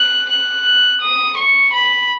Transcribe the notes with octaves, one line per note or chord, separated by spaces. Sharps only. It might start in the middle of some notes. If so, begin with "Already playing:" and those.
Already playing: F#6
F#6
D#6
C#6
B5